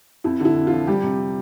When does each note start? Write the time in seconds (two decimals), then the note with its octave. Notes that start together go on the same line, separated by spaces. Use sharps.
0.24 F2 E4
0.40 D3 E4
0.56 F2
0.67 F4
0.72 F3
0.87 G3 G4
1.03 C3